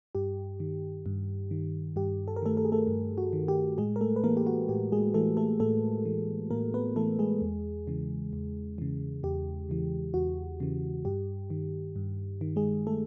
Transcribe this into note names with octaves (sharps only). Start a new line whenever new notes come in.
G2 G4
D#3
G2
D#3
G2 G4
A4
A#4
D#3 A3 A4
A4
G#4
A3 A4
G2
F#4
D#3
G4
A2 G#3 G#4
A#4
A3 A4
B4
E3 A#3 A#4
G4
F#4
A2 G4
G#3 G#4
E3 A3 A4
A3 A4
A2 A3 A4
E3
A2 A#3 A#4
B3 B4
E3 A3 A4
G#3 G#4
E2
C#3 E3
E2
C#3 E3
E2 G4
C#3 E3
E2 F#4
C#3 E3
G2 G4
D#3
G2
D#3
G#3 G#4
A3 A4